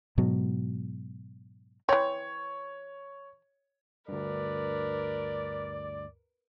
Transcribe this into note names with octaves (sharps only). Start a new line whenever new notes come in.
G#2 B2 F#3
E3 C4 C#5
D2 G2 A#4 B4 D5